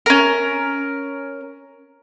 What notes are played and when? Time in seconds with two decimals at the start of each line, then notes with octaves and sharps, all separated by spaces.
0.06 C#4 A#4